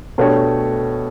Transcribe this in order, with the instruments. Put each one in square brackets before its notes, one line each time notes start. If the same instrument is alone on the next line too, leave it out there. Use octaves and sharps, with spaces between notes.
[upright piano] B2 A3 D4 G4 C#5